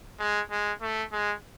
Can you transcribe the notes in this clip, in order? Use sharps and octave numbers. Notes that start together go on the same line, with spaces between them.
G#3
G#3
A3
G#3